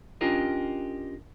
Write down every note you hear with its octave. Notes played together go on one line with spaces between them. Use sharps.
C#4 D4 F4 G4 A#4 D#5